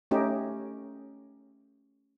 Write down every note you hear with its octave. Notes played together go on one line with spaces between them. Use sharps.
A3 C#4 D#4 G4